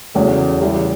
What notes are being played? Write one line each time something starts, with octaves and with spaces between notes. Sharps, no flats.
E2 C#3 F#3 A3
C#3 E3 G3